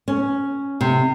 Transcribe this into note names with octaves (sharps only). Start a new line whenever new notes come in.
C#4
C3